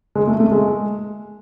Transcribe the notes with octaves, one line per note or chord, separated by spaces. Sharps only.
G#3
A3
A3
G#3